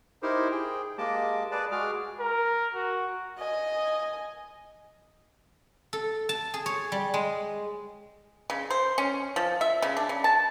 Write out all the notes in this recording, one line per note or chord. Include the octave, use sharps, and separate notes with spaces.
D#4 E4 G4 A#4 C5
G#4 G5
G#3 A#3 G4 D#5 A5 D6
G#4 B4 D5 A5 D6
G#3 F#4 G#4 D6 F6
A#4
F#4
D#5 G#5
A4
A5
G#4
C#5
G3
G#3
C#3
C5
C#4
F3
E5
C#3
D4
C#3
A5